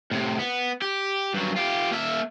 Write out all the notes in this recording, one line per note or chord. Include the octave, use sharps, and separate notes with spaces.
A2 C3
B3
G4
G2 F#3
F4 G4
A#3 E5